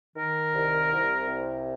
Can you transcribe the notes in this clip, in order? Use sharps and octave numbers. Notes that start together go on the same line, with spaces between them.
D#3 A#4
C2
C2
C3